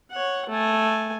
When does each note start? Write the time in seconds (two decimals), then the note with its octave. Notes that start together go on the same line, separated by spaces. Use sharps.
0.11 C#5 F#5
0.49 A3 G#5